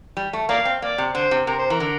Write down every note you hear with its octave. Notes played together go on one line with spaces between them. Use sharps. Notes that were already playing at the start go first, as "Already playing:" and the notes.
G3
A3
A#3 A#4 D5 F5
C4
A#3 D5
C3
D3 C5
C3
C3 A#4
C5
E3 A#4
D3